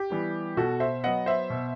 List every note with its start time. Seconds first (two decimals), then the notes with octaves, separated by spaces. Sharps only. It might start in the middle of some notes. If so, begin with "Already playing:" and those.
Already playing: G4
0.10 E3 G3 B3
0.57 B2 F#4 A4
0.80 C5 E5
1.04 F#3 B3 D#5 F#5
1.26 C5 E5
1.50 B2